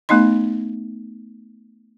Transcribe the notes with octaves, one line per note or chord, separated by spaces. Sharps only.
A3 B3 D#4 D#5 C6